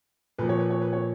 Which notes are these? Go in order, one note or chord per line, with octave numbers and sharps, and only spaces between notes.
A#2 F3 B4
C#5
B4
C#5
B4
C#5